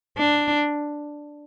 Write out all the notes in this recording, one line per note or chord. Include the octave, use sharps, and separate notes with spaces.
D4